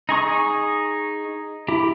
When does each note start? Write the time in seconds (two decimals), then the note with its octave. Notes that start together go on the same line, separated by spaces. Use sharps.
0.09 D#4 G#4 C#6 D#6
1.68 E4 G4